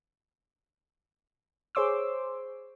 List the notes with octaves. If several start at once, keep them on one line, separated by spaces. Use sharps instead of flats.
G#4 C5 C#5 C6 D6 E6